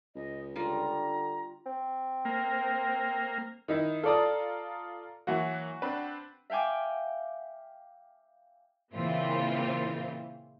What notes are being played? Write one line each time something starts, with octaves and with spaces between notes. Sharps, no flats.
C#2 D#5
D3 G3 F4 A#5
C4
A#3
D#3 D#4 E4
F4 A4 D5 A#5 D#6
E3 F#3 A#3 F#4
C4 D4 B4
E5 F5 G5 G#5 D6
A#2 C#3 E3 A#3 C4 F4